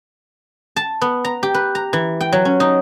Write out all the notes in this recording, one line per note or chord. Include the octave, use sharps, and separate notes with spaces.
A5
B3
A#5
G4
B4
A#5
E3
G5
F#3
C#4
D#4